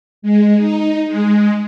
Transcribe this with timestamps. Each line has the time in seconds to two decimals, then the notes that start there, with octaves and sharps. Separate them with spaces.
0.22 G#3
0.57 D#4
1.07 G#3